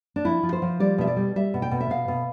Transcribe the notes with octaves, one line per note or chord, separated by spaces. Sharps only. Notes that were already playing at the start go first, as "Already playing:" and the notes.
D4
F3 E4
F3
C5
F3
G3 D5
B2 E5
D5
G3
G3 E5
B2
G5
B2
E5
B2 F5
B2